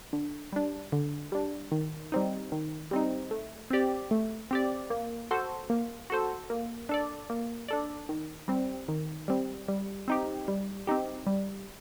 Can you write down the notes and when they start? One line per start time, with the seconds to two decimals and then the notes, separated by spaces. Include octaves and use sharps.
0.13 D3
0.53 G3 D4
0.92 D3
1.32 G3 D4
1.71 D#3
2.12 G3 C4 D#4
2.52 D#3
2.91 G3 C4 D#4
3.31 A3
3.70 C4 G4 D5
4.11 A3
4.51 C4 G4 D5
4.90 A#3
5.31 F#4 A4 C5
5.70 A#3
6.10 F#4 A4 C5
6.50 A#3
6.89 D4 A4 D5
7.30 A#3
7.68 D4 A4 D5
8.09 D#3
8.48 G3 C4
8.88 D#3
9.28 G3 C4
9.68 G3
10.08 C4 D#4 G4
10.48 G3
10.87 C4 D#4 G4
11.26 G3